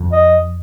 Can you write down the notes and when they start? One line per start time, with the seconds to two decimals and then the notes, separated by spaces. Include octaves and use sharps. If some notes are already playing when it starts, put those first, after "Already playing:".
Already playing: F2
0.12 D#5